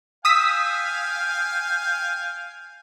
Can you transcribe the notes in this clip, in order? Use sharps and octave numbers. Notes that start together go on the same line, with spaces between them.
F5 G5 G#5 D#6 E6 B6